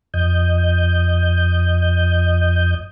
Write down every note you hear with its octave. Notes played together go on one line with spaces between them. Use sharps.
F2 D#5 G6